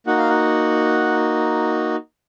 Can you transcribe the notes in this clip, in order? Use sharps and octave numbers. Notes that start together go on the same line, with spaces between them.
A#3 D#4 F#4 F#5
F5
F#5